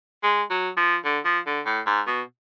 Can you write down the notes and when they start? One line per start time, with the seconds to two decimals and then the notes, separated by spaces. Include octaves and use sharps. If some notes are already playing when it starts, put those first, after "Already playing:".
0.23 G#3
0.50 F#3
0.77 F3
1.05 D3
1.25 F3
1.47 D3
1.66 A2
1.86 G#2
2.07 B2